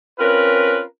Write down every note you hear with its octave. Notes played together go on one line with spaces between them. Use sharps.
C4 C#4 F4 A#4 B4